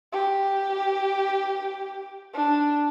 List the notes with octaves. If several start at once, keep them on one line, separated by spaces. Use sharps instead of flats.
G4
D4